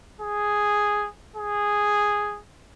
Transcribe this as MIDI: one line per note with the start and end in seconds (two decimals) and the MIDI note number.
0.21 1.08 68
1.36 2.41 68